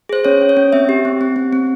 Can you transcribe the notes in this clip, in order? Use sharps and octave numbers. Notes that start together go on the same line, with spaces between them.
G#4 C5
C#4 C#5
C#4
C#5
C#4
C4 E5
G4
C4
C4
C4
C4